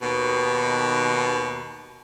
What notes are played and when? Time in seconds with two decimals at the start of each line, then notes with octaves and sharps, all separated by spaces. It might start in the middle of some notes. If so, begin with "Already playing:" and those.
0.02 D#2 B2